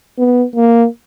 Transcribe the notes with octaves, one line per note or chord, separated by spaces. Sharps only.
B3
A#3